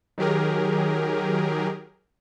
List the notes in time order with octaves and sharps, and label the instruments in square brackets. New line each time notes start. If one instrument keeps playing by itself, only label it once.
[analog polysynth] D#3 F#3 G4 G#4 A#4